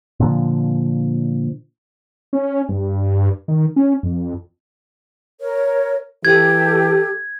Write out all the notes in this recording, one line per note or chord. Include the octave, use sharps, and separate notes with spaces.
A#2 D3 F3
C#4
G2
D#3
C#4
F2
A#4 C#5
E3 G4 A4 G#6